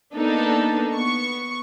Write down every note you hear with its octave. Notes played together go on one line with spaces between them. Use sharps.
A#3 B3 D4 D#4 A4
B3 C#6